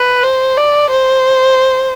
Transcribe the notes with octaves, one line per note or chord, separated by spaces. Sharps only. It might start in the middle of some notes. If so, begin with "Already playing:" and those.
Already playing: B4
C5
D5
C5